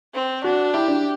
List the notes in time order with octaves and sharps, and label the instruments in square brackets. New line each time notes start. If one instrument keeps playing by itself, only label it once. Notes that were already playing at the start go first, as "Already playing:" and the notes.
[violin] C4
[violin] D4 [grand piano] F#4
[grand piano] E4 [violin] G4
[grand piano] D4